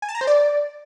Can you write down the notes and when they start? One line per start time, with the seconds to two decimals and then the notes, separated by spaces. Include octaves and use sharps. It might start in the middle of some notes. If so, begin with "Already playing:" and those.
0.02 G#5
0.09 A5
0.15 A#5
0.21 C5
0.27 D5